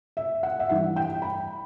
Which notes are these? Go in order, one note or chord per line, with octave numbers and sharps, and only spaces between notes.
E5
F#5
E5
G2 E3 F#5
G5
B5